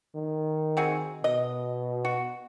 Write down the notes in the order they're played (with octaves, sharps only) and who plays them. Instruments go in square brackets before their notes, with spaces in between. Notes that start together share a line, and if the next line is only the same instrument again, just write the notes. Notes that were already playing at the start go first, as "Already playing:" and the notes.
[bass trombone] D#3
[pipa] C4 F#4 G#4
[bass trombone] B2 [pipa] D#5
[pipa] F#4